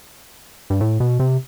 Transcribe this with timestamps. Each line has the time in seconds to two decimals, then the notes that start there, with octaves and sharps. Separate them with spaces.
0.70 G2
0.81 A2
1.00 B2
1.20 C3